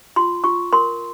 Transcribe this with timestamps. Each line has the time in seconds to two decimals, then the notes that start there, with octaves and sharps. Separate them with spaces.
0.16 F4 C6
0.44 F4 C#6
0.73 A#4 C6